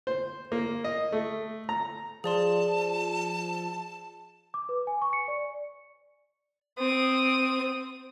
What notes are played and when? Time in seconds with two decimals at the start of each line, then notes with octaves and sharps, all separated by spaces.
0.07 C5
0.52 A#3
0.84 D#5
1.12 A3
1.69 A#5
2.24 F3 G#4 D5 A5 C6
4.54 D6
4.69 B4
4.87 G#5
5.02 C#6
5.13 C#7
5.28 D5
6.78 C4 D#6